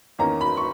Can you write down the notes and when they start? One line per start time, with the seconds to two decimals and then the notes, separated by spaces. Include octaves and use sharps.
0.19 E2 D#3 A#3 C#4 A#5
0.41 B5
0.57 C#6